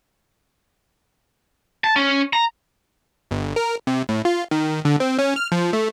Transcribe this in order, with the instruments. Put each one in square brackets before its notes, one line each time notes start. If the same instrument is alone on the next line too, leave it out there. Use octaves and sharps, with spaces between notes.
[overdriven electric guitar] A5
C#4
A#5
[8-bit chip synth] G1
A#4
C3
A2
F4
D#3
D3
C4
C#4
F6
F3
A3